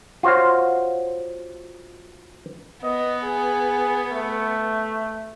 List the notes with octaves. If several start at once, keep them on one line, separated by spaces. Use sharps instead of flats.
F4 F#4 C5 C#5 F5
B3 D#5
G#4
A3